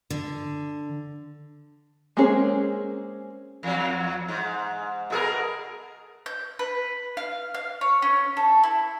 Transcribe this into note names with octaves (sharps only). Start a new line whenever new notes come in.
D3
G#3 A#3 C4 C#4 G#4
E2 F#3
G#2
B2 G#4 A#4
G6
B4
F5
F5
C#5
C#4
A4
E4